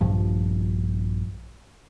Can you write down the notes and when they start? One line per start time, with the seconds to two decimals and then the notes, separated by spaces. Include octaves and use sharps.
0.01 A#1 G2 F3